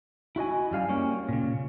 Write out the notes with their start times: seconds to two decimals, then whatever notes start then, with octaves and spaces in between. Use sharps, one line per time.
0.36 E4 F#4 D#5 G#5
0.71 F#2 G3 F5 G#5
0.89 G3 A#3 C#4 C#5
1.29 A#2 C#3